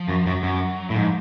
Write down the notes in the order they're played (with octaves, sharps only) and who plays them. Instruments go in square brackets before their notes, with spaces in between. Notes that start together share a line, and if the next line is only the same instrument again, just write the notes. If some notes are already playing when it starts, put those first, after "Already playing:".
Already playing: [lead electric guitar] F3
[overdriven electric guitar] F#2
[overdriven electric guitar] F#2 [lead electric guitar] F#3
[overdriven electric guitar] F#2
A2
[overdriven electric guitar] G#2 [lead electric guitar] F3